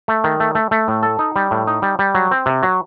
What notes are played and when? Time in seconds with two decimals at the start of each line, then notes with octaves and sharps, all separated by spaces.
0.08 A3
0.24 D#3
0.40 A3
0.55 A3
0.71 A3
0.88 A2
1.03 A4
1.19 D#4
1.36 G3
1.51 A2
1.67 D#4
1.82 G3
1.99 G3
2.15 F#3
2.31 C4
2.46 C3
2.63 F#3